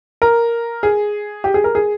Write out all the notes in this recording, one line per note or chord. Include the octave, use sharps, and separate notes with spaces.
A#4
G#4
G4
G#4
A#4
G#4